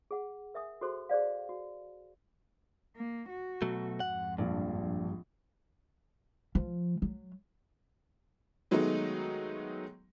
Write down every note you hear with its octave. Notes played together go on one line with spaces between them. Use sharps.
G#4 F#5
A#4 E5 G#5 D#6
F#4 G#4 A4 C5 C6
G#4 C5 D5 F5
F#4
A#3
F#4
B2 F#3 A3
F2 G#2 F#5
A#1 G2
F3
F#3
D#3 F#3 G#3 A3 B3 D#4